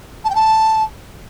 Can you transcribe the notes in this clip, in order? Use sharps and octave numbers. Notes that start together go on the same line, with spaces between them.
A5
G5
A5